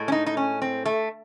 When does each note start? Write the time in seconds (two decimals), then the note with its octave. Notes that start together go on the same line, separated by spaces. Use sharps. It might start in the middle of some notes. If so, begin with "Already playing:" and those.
Already playing: A2 G#3
0.08 C#4
0.12 D#4
0.26 D#4
0.37 C#4
0.62 C4
0.86 A3